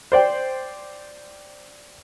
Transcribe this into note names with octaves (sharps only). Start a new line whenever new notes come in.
C5 D5 G5